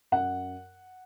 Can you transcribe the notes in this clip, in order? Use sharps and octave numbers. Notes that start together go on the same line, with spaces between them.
F#2 F#5